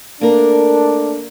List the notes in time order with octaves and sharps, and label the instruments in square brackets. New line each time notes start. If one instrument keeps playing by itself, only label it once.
[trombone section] A3 D4 [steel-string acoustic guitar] A#3 A#4